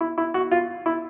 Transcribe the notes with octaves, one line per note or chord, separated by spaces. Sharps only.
E4
E4
F#4
F4
E4